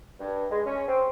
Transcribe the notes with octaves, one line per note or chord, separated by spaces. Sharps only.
G2
G#3
C#4
C4